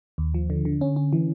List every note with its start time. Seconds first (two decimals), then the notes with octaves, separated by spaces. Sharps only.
0.18 D#2
0.34 F3
0.50 D3
0.65 D3
0.81 C#4
0.96 C#4
1.13 E3